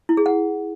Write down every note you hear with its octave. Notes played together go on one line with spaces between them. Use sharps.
E4
G#4
F#5